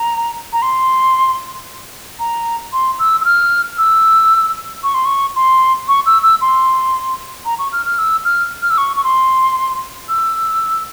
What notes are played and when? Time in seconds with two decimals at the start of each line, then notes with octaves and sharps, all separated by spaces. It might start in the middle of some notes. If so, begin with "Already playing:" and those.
Already playing: A#5
0.53 A#5
0.62 C6
2.19 A#5
2.73 C6
2.99 E6
3.21 E6
3.25 F6
3.78 E6
4.83 C#6
4.94 C6
5.05 C#6
5.36 C6
5.88 C#6
6.06 E6
6.23 E6
6.41 C6
7.45 A#5
7.59 C#6
7.73 F6
7.86 F6
7.98 E6
8.25 F6
8.62 F6
8.70 E6
8.78 C#6
8.97 C#6
9.04 C6
10.09 E6